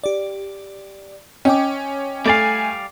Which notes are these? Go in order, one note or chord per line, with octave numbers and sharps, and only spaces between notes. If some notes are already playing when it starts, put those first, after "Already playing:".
G4 D5
C#4 D#5 G5 D6
G3 A3 D5 F5 G#5